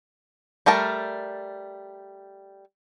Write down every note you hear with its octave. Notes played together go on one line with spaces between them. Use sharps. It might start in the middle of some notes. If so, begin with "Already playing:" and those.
G3 A3 A#4 A5